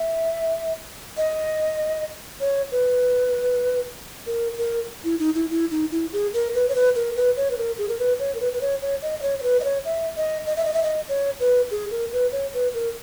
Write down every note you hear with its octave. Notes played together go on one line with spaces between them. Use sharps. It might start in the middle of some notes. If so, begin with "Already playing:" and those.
Already playing: E5
D#5
C#5
B4
A#4
A#4
E4
D#4
E4
E4
D#4
E4
G#4
A#4
B4
C#5
B4
A#4
B4
C#5
B4
A#4
G#4
A#4
B4
C#5
A#4
B4
B4
C#5
C#5
D#5
D#5
C#5
C#5
B4
D#5
C#5
E5
D#5
D#5
E5
D#5
E5
D#5
C#5
B4
G#4
A#4
B4
C#5
B4
A#4